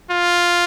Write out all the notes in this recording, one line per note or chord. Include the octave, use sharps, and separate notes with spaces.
F4